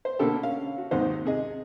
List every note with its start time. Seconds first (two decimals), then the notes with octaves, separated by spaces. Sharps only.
0.05 C5
0.19 B2 D3 A#3 D4 G4 A4
0.43 C#4 F5
0.78 F#4
0.91 D#2 G#2 C3 D#4 C5
1.25 C3 G#4 D#5